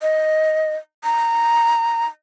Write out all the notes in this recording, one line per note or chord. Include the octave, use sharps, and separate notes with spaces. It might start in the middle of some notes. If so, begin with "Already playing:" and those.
D#5
A#5